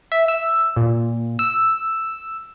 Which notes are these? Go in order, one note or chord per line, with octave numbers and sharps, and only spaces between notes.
E5
E6
A#2
E6